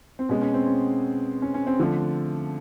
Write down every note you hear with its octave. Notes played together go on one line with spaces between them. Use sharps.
C4
B2 G#3 C#4
C#4
C4
C#4
C#4
C#4
C4
D3 F3 A3